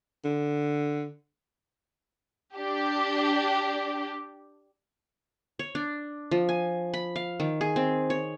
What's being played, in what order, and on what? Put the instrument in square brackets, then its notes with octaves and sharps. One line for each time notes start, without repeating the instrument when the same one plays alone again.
[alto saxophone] D3
[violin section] D4 G4
[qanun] C#5
D4
F3
G#5
B5
F5
D#3
G#4
C4
C#5